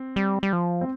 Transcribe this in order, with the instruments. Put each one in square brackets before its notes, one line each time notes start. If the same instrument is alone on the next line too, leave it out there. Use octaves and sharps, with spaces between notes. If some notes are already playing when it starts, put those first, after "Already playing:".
Already playing: [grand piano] C4
[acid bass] G3
G3
F3
[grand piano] C4